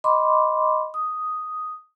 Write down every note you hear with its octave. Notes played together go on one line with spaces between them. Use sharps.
D#5 B5 C6 D6
D#6